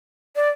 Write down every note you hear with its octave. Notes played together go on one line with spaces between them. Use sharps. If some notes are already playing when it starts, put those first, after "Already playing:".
D5